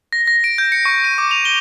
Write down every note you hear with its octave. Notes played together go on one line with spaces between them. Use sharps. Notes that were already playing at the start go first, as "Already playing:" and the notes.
A#6
A#6
D7
G6
C#7
C#6
D#7
D6
F7
G7